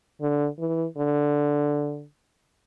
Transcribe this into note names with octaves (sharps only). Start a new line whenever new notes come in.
D3
E3
D3